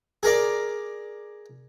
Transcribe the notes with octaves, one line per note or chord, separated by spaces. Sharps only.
G#4 A#4 D5